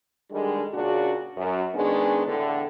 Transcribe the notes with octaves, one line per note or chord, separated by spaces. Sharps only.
D3 D#3 G3 G#3 D4
A#2 C#3 C#4 D4 F#4
F#2
D#3 G#3 B3 C#4 D4
E2 A2 D3